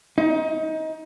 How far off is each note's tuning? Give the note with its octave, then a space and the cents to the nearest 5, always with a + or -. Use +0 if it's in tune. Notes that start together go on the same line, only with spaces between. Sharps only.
D#4 +25